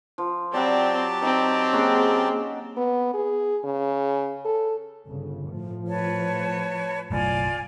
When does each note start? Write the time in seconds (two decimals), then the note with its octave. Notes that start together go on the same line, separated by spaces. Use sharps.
0.18 F3
0.54 F#3 C4 G4 D5 F#5 A5 B5
1.23 C4 D#4
1.73 A#3 C#4 D#4 F#4 G#4
2.77 B3
3.14 G#4
3.64 C#3
4.45 A4
5.09 G1 C#3
5.48 A2 F3
5.87 B4 C#5 A5
7.11 F#1 B1 A2 F4 D5 G#5